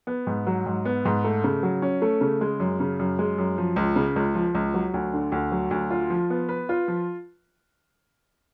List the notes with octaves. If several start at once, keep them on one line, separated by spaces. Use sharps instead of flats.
B3
G#2
F#3
G#2
B3
G#2
A3
C#3
F#3
C#4
A3
C#3
G#3
F#2
C#3
F#2
G#3
F#2
F3
C#2
C#3
C#2
F3
C#2
F#3
D2
D3
D2
F#3
D2
F4
F3
B3
B4
F4
F3